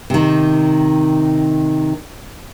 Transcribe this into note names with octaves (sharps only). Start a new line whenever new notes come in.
C3 D#3